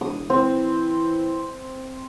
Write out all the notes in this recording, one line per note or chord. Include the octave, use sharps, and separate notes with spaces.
E1 D#6
E3 C4